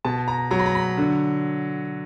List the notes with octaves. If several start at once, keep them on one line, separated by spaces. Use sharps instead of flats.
B2 A5
A#5
F#3 A#5
B5
A#5
B5
D3